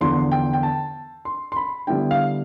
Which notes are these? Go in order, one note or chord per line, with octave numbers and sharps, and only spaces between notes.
E2 D3 F3 B3 C6
G5
G5
A5
C6
C6
B5
D3 G3 B3 E4 G5
F5